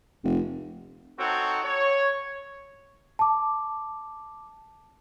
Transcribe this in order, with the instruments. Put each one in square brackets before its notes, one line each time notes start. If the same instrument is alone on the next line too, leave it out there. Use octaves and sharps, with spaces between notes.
[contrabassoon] F1
[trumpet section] C4 D#4 F#4 A4 C#5
C#5
[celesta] A5 D6